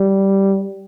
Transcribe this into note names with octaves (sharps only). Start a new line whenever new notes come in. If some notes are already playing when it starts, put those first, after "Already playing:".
Already playing: G3